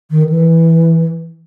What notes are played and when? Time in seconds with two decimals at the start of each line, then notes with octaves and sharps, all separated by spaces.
0.11 D#3
0.29 E3